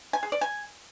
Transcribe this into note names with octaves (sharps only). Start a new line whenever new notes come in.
G#5
G#4
D5
G#5